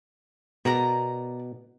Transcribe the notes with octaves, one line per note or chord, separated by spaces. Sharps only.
B2 A#4 D5 A#5